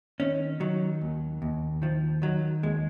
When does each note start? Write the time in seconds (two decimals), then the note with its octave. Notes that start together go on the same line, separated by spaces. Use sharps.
0.20 D#3 C#4
0.60 D#3 F#3
1.01 D#2
1.42 D#2
1.82 D#3 F3
2.22 D#3 F#3
2.63 D#2 G#3